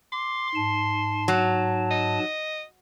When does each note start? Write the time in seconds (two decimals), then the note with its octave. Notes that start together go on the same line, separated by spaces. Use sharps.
0.12 C6 D6
0.55 G#2 A5
1.28 F#3
1.91 D#5